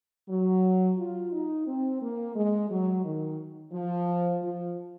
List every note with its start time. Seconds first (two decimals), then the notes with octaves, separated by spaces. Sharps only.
0.29 F#3
0.97 F4
1.32 D#4
1.67 C4
2.01 A#3
2.35 G#3
2.70 F#3
3.04 D#3
3.73 F3
4.42 F3